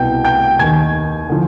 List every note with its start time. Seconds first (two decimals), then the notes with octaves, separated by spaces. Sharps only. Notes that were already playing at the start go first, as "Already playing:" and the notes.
Already playing: C2 B2 G5 G6
0.25 G5 G6
0.59 D#2 D#3 G#5 G#6
1.29 D3 F3